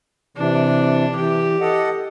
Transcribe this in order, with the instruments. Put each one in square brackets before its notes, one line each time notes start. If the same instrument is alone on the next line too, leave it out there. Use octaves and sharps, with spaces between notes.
[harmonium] C3 E3 [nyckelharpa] D4
[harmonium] E3 [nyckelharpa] G4
[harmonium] A4 D#5 F#5